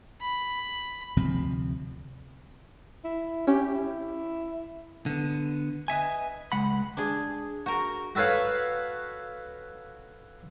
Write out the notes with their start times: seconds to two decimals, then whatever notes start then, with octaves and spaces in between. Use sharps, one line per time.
0.21 B5
1.17 D2 C3 F3 C4
3.04 E4
3.47 C#4 G4
3.75 E4
5.06 D3 B3
5.88 B4 D#5 E5 G#5
6.52 C#2 G#3 F#5 B5
6.97 D4 G#4
7.66 F#4 A#4
8.15 F#4 A4 B4 C#5 F5